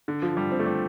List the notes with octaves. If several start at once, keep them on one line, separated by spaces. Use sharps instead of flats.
D3
F3
G3
C4
A3
G3